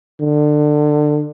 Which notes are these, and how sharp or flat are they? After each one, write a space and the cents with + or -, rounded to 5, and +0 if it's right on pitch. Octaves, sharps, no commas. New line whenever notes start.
D3 +25